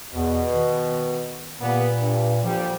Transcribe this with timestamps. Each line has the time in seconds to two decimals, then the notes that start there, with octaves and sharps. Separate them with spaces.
0.14 E2 B2
0.52 D#3
1.61 A#2 G3 A#3 B3
2.00 G2
2.44 A#2 D3 F3 G3